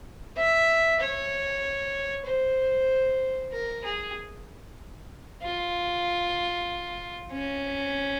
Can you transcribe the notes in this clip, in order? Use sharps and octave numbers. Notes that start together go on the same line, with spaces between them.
E5
C#5
C5
A#4
G#4
F4
C#4